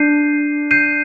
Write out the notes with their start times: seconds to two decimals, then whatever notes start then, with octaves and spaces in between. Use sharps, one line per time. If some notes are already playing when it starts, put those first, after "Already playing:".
Already playing: D4 G6 C7 D#7
0.71 G6 C7 D#7